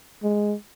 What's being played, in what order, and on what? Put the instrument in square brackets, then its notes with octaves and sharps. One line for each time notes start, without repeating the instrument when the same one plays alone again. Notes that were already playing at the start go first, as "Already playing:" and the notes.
[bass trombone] G#3